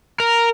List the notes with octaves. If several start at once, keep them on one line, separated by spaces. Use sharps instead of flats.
A#4